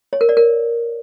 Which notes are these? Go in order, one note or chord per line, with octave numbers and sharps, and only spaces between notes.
C#5
A#4
D5
A#4